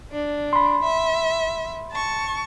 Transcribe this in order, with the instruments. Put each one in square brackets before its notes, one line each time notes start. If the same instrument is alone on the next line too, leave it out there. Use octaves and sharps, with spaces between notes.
[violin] D4
[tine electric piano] B5 C6
[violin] E5
A5 C#6